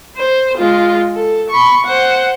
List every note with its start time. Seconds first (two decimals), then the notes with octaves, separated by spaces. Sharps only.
0.17 C5
0.58 G#3 F4
1.16 A4
1.50 B5 C#6
1.85 C5 F#5